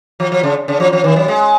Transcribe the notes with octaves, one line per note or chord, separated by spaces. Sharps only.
F3
F3
C#3
C#3
F3
F3
D#3
F#3
G#3